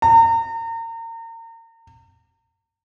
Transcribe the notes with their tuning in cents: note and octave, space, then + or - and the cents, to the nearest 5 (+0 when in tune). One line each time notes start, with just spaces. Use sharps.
A#5 -35